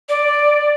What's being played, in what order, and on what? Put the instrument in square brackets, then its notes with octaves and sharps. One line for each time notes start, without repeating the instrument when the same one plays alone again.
[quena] D5